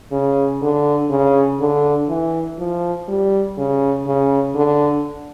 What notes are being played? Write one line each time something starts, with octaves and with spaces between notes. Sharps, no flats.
C#3
D3
C#3
D3
E3
F3
G3
C#3
C#3
D3